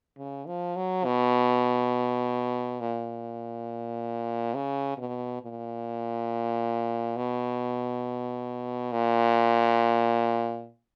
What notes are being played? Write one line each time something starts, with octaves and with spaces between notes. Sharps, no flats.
C#3
F3
F#3
B2
A#2
C#3
B2
A#2
B2
A#2